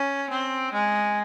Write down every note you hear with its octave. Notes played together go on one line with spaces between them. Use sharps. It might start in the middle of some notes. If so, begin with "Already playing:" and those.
Already playing: C#4
C4
G#3